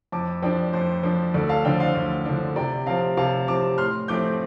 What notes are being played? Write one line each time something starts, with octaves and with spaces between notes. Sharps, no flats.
F2 A5 D6
F3 D4 D5 G5
F2 C5
F3 D4
D2 A4 D5
F5 A5
D3 F3 D4 D5 G5
C5 F5
D2
D3 F3 D4
C3 D5 G5
F3 C4 F5 A5
C3 F5 A5
F3 C4 A5 D6
A2 C6 F6
F3 A3 C4 D6 G6